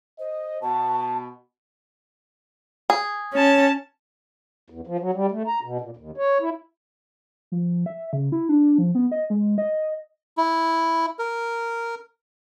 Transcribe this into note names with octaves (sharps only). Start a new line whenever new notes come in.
C5 D#5
B2 A5
G#4
C#4 C#5 A5
E2
F3
F#3
G3
A3
A#5
B2
A#2
D#2
C#5
E4
F3
E5
C#3
E4
D4
F3
B3
D#5
G#3
D#5
E4
A#4